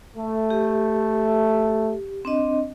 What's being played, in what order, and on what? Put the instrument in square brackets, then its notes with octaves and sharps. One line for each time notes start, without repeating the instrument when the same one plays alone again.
[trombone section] A3
[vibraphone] G4
C4 D4 D#5